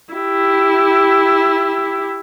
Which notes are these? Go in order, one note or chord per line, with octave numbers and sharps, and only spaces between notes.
E4 G4